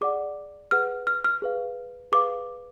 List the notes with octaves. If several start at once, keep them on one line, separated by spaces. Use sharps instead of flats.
G#4 D5 F#5 D6
G#4 B4 F#5 F6
F6
F6
G#4 B4 F5
G#4 B4 F5 D6